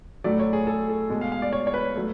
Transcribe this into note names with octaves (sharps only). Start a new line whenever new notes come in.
A2 F#3 A3 D5
C#5
G#4
A4
A4
B2 G#3
F5
F5
D5
C#5
C#5
B4
F#3 A3